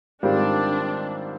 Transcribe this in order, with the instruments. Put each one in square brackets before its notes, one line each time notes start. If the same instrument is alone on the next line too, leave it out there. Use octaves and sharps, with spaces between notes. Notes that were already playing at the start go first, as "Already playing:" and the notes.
[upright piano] G#2 D#3 G3 C4 F4 [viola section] D4